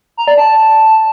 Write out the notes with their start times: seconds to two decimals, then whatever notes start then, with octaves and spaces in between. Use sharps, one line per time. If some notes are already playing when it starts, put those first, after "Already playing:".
0.17 A#5
0.28 D5
0.38 A5